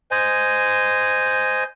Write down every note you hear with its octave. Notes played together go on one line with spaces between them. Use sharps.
C5 D#5 G#5